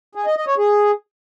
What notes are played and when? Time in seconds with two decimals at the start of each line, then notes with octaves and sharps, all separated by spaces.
0.15 G#4
0.26 D#5
0.36 D#5
0.47 C#5
0.58 G#4